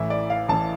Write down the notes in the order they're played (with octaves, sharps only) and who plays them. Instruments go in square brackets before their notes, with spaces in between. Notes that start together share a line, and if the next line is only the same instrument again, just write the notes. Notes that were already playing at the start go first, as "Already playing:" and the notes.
Already playing: [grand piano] A1 A2 E3 E5
D5
F5
A1 A2 E3 A5